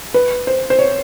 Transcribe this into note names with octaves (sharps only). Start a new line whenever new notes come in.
B4
C5
C5
C#5